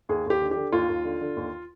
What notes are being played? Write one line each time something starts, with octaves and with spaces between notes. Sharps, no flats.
D#2 G#4
D#2 G4
D3
G4
D3
D#2 F4
D#2
D3
D3
D#2